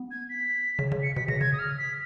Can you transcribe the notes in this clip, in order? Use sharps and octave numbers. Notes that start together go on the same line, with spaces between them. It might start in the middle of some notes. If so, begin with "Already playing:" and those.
Already playing: B3
G#6
B6
C#3
C#3
C#7
B2 B6
C#3 A#6
C#3 G#6
D#6
F6
B6